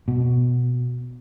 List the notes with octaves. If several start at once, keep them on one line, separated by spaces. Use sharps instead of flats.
B2